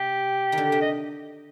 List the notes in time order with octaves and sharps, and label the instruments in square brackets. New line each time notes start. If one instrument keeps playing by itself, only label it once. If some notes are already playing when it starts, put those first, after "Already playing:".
Already playing: [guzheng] C3 [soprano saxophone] G4
[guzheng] D#3
D3
C3
[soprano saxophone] D#5